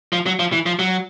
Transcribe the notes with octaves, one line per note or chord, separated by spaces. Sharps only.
F3
F#3
F3
E3
F3
F#3